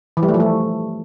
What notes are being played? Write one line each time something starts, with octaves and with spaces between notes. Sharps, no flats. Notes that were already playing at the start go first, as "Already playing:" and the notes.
E3
G3
A3
F3
A3